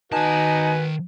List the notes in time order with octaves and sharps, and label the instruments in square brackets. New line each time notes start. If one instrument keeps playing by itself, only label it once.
[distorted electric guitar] D#3 A5 [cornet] D#4 [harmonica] F#4 B4 F#5 [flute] G#5